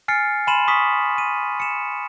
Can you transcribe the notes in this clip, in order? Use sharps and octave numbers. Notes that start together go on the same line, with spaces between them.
G#5 F6 A6 C7 C#7
G#5 B5 C6 D#7 E7 F#7
C#6 D#6 B6
D#7
C#7 E7